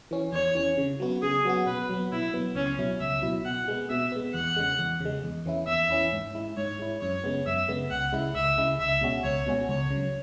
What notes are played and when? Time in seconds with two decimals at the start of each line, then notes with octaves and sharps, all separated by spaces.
0.11 E3 C#4
0.33 E2 C#5
0.55 E3 C#4
0.78 C#3
1.00 F#3 B3 F#4
1.22 C#3 G#4
1.45 F#3 B3 F#4
1.66 B2 B4
1.89 F#3 B3
2.12 B2 E4
2.34 F#3 B3
2.55 C#2 C#4
2.79 B2 F#3 E4
3.00 C#2 E5
3.22 B2 F#3 E4
3.45 B2 F#5
3.68 G#3 B3
3.90 B2 E5
4.12 G#3 B3
4.34 E2 F#5
4.57 C#3 G#3
4.79 E2
5.00 C#3 G#3
5.23 E2
5.46 E3 C#4 E4
5.68 E2 E5
5.90 E3 C#4 E4
6.12 G#2
6.35 G#3 E4
6.57 G#2 C#5
6.79 G#3 E4
7.01 F#2 C#5
7.24 C#3 G#3 B3
7.46 F#2 E5
7.68 C#3 G#3 B3
7.90 C#2 F#5
8.12 C#3 G#3 E4
8.35 C#2 E5
8.58 C#3 G#3 E4
8.80 C#2 E5
9.01 B2 G#3 C#4 F#4
9.24 C#2 C#5
9.46 B2 G#3 C#4 F#4
9.69 C#2 C#5
9.91 C#3 F#3